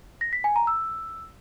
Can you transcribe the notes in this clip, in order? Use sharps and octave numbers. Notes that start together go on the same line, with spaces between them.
A#6
B6
G#5
A#5
E6